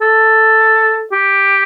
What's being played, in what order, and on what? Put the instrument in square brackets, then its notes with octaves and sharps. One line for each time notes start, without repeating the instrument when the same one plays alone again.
[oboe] A4
G4